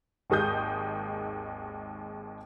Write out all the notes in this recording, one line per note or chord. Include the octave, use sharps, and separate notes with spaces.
G#1 D#2 G#3 D#6 G6